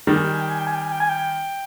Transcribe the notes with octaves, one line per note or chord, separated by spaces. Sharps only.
D#3 G3 G5
G#5
G5
G#5
G5
G#5
G5
G#5
G5
G#5
G5
G#5
G5